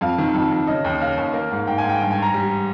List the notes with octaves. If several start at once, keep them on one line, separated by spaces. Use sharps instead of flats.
F2 F5
D#3
F2
F2
C#3 D#5
D#2
C#3 F5
D#2
A#3
G#2
G#2 G5
G#5
G#2
G5
G2 G5
G#5
G2 A#5
G3